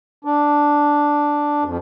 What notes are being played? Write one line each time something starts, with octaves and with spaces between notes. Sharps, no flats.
D4
F2